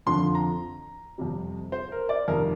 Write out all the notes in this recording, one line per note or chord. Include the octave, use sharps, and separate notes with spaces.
F2 D3 F3 C6
A#5
F2 C3 G3
C5
A#4
D5
F2 C3 D#3 G3 A#4